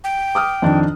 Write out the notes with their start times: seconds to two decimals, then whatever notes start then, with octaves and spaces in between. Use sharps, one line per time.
0.04 G5
0.35 D6 D#6 F6
0.62 F2 D#3 D4